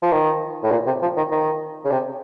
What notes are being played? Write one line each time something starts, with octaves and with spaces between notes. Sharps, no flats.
F3
D#3
A2
A#2
C3
F3
D#3
D#3
C#3
C3